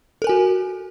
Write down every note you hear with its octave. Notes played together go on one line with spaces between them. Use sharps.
F#4 A4 A#4 G#5